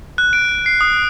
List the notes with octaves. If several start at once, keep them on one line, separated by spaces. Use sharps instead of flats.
F#6
D7
C7
D#6